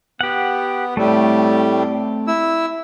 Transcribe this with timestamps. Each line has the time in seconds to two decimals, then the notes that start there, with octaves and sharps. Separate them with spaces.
0.21 B3 G4 F#5
0.97 A2 G3 A3 C4
2.27 E4 E6